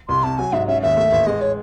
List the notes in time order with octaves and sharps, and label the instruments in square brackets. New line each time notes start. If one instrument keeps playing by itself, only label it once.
[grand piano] C2 [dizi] C6
[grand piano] C3 [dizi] A5
[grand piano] F#3 [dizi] G#5
[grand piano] G#2 [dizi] E5
[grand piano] C#4 [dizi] E5
[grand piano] D#2 [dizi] E5
[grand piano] A3
A1
[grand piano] G#3 [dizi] D#5
[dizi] C#5